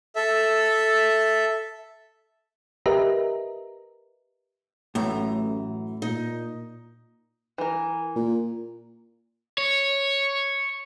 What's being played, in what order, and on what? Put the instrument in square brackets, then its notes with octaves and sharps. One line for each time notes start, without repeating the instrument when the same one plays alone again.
[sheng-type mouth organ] A4 E5
[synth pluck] G4 A#4 B4 D#5 E5 A#5
[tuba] A1 [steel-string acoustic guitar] F#2 E3 A#5 [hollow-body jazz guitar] A2
[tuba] A#2 [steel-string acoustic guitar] D#4
[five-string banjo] E3 A#4
[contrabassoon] A#2
[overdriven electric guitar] C#5